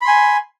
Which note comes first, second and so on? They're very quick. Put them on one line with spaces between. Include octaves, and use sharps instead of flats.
B5 C6 G#5